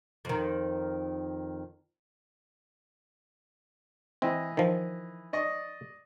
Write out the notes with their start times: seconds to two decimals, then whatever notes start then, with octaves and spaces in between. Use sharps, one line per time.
0.25 F2 D#3
4.22 E3 C4 D#5
4.57 D#3 F3
5.33 D5 D#5 C#6